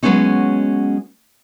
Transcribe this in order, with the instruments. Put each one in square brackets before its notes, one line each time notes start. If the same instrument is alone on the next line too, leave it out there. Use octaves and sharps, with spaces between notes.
[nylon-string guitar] F#3 G#3 A3 B3 C#4 D#4